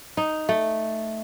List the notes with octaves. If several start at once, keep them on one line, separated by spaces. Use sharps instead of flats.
D#4
A3